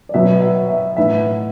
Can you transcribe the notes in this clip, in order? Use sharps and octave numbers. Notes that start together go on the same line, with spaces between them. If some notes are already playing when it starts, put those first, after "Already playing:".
D5
B2 F#3 B3 E5
E5
E5
A2 E3 B3 D4 E5